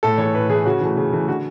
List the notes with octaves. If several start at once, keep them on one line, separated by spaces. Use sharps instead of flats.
A2 A4
E3 A3 C#5
A2 B4
E3 A3 G#4
C#3 F#4
E3 A3
C#3
E3 A3
D3 F#4